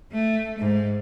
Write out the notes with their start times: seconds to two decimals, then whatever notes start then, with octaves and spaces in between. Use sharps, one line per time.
0.12 A3
0.58 G#2